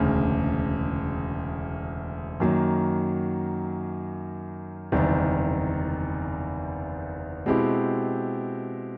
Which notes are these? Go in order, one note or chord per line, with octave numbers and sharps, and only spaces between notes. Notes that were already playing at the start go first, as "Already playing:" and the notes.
Already playing: E1 D2 C#3
F#2 D#3 F#3 A#3
F#1 E2 C3 D#3 G3
B2 G#3 C4 E4 G4